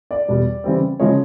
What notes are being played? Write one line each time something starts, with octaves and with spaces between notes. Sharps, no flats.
D5
E2 B2 G3
C#3 E3 G3 C4
C#3 F3 G#3 C#5